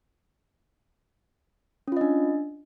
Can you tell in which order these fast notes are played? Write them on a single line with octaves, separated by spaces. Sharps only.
C#4 F4 D#5 D4